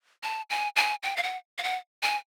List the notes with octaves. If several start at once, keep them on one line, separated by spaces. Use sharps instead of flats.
A5
G#5
G#5
G5
F5
F#5
F5
F#5
G#5